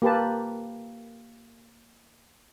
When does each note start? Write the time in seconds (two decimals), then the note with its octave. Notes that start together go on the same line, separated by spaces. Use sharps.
0.02 A#3 G4 B4 A5